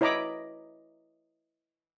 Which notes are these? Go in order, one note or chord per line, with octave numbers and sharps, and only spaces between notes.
E4 C#5 D#5 A#5 B5 D6